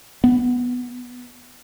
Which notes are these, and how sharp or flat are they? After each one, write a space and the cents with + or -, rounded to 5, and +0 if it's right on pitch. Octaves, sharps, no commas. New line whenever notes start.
B3 -5